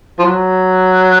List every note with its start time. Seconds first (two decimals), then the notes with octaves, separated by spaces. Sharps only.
0.19 F3
0.25 F#3